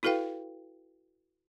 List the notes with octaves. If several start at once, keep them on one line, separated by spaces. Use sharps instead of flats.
E4 F#4 A4 B4 F5 G5